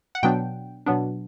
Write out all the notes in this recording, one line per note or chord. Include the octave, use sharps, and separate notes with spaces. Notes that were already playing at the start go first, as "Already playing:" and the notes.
F#5
B2 F#3 B3 D4 G5
B2 F#3 B3 D4